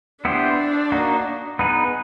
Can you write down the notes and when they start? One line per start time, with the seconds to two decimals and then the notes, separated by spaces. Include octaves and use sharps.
0.25 B3 D4 E4 G4 C5
0.92 A#3 D#4 F#4
1.59 B3 D#4 G#4 B4